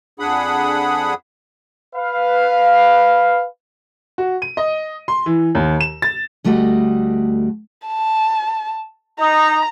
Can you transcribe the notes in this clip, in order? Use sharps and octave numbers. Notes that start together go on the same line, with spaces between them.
F2 D4 G#4 F#5 B5 D#6
B4 F5
F#4
D#7
D#5
C6
E3
D#2
E7
A6
D2 G3 A3 F#4 D#5
A5
D#4 A#5